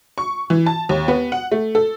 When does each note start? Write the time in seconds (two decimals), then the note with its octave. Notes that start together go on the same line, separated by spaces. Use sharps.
0.18 C#6
0.50 E3
0.66 A5
0.89 D#2
1.08 B3
1.32 F#5
1.52 A3
1.75 A4